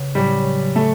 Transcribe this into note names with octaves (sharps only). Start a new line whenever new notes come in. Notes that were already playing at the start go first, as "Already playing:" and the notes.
Already playing: C#3 B3
A2 F#3 G3 C#4 G4
C#3 F#3 A3 C#4 F#4 A4